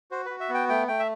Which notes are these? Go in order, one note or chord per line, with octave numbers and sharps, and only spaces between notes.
F#4 C5
F#4 B4
E5
B3
G5
A3 G5
A3 G5
E5